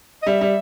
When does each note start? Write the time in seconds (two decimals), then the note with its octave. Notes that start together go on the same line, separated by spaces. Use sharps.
0.23 D#5
0.26 G3 E5
0.41 G3